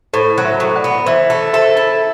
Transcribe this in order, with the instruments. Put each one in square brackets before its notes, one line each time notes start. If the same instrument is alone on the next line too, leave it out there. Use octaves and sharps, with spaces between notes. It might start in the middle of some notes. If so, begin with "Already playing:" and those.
[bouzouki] A2 [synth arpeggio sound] A4 C5
[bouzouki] F#3
[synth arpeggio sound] C5 E5
[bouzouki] A2
[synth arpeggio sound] D5 F#5
[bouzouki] B3
[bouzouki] E3 [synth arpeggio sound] C5 E5
[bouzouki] A3
[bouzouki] A4 [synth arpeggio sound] C5 E5
[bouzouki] E4